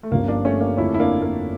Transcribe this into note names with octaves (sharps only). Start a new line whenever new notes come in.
A3
G1 G2 F3 A#3 C#4
A#3 D4
A3 C#4
A#3 D4
F2 D3 F3 A3 C#4 E4
E4
A#3 D4
A#3